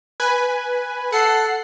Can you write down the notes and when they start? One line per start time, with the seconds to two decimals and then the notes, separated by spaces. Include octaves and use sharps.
0.20 B4 G#5
1.12 A4 F#5 C7